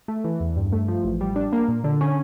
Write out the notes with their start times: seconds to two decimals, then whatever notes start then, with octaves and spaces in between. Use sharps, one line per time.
0.08 A3
0.24 E3
0.40 E2
0.56 G2
0.72 A3
0.88 F3
1.04 A1
1.21 G3
1.36 D4
1.53 A#3
1.68 A#2
1.84 D3
2.01 C#4